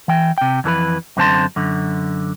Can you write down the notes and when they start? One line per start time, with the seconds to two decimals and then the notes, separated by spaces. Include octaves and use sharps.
0.08 E3 G5
0.38 C3 G5
0.64 F2 E3 A4 B4
1.17 F#2 D3 C4 D4 A5 C6
1.56 F#2 D3